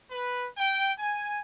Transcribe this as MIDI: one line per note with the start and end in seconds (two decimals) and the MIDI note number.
0.10 0.47 71
0.57 0.91 79
0.98 1.39 80